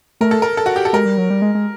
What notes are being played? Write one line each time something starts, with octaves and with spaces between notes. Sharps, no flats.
A3 A#4
A4
A#4
A4
F#4
G4
A4
G#3 A#4
G3
F#3
G3
G#3
G#3